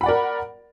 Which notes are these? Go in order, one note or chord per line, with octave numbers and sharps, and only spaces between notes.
A#4 D5 F#5 B5